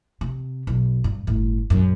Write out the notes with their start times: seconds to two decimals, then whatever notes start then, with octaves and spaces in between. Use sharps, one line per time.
0.21 C3
0.67 B1
1.04 G2
1.27 G1 A2
1.70 A#1 F#2